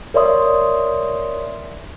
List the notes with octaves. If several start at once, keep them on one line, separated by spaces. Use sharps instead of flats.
A#4 C#5 D5 E5 C6 D#6